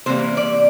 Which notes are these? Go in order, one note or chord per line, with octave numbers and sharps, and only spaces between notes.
C3 E3 G3 A#3 C5
D5